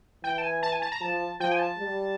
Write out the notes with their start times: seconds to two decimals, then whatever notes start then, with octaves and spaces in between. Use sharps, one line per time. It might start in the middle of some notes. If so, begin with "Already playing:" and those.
0.23 E3 G5
0.38 A5
0.43 G#5
0.63 A5
0.72 G#5
0.82 A5
0.92 A#5
1.01 F3 A5
1.40 F3 G5
1.52 G#5
1.59 A5
1.79 G3